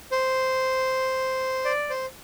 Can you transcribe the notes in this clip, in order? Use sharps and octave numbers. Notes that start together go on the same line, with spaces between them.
C5
D5
C5